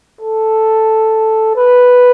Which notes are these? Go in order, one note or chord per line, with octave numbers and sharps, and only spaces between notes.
A4
B4